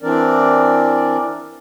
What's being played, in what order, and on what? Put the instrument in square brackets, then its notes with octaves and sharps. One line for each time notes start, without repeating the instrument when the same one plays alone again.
[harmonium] E3 C4 D4 A#4 D5